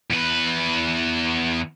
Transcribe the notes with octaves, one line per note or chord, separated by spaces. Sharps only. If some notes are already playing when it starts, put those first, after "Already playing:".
E2 B4